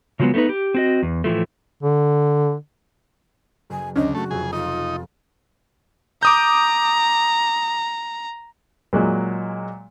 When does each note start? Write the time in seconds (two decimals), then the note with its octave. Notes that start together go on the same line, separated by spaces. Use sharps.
0.20 C#3 F3 F#3 G#3 B3
0.34 A3 B3 C#4 D#4 B4
0.49 G4
0.75 C4 F#4 D#5
1.03 E2
1.24 A2 E3 F3 A3
1.83 D3
3.70 F#1 G#5
3.96 D2 C#4 D4 D#5
4.15 A3 C4 F#4
4.31 F1 F2 G#4
4.53 D#4 F4
6.23 A#5 D6 D#6 G6
8.93 A#2 F#3 G#3